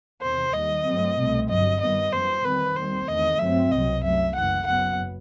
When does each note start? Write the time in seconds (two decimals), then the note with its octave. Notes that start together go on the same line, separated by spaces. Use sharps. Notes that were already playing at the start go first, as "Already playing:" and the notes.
0.22 E2 C3 D#3 C5
0.53 D#2 D#3 G3 D#5
0.86 G2 F#3 A3 C4
1.17 C2 B2 A3 C4
1.49 G1 G2 F#3 D#5
1.81 G2 D#3 G3 B3 D#5
2.12 F#2 E3 B3 C5
2.44 E2 D#3 G3 C4 B4
2.76 D#2 D#3 G3 C4 C5
3.08 E2 D#3 A3 D#5
3.39 G2 F#3 C4 E5
3.71 C2 B2 F#3 D#5
4.03 F#2 F#3 A3 E5
4.35 F#1 F#2 E3 F#5
4.66 F#1 F#2 F#3 B3 F#5